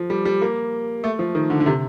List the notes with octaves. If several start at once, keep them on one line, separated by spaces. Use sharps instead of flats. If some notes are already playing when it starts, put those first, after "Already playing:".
Already playing: F3
G3
G3
A#3
A3
F3
D#3
D3
D3
C3